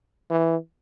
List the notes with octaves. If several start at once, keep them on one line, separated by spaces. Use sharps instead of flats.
E3